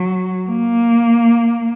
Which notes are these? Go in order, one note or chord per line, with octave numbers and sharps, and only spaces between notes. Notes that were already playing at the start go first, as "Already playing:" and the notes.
Already playing: F#3
A#3